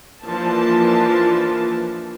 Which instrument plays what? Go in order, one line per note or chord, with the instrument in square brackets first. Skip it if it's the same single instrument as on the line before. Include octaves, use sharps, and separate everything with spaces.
[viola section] E3 F3 A#3 D4 A5